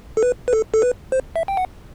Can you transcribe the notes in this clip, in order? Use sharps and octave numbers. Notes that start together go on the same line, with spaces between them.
A4
B4
B4
A4
A4
B4
C5
E5
G5
F#5